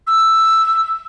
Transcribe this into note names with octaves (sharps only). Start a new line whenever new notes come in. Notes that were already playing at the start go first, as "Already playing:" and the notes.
E6